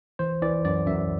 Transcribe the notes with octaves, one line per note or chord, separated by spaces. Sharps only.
E3 C5
E3 D5
F#2 D5
F#2 E5